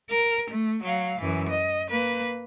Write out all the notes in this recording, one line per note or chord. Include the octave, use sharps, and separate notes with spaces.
A#4
A3
F#3 F5
F#2 E3
D#5
A#3 B4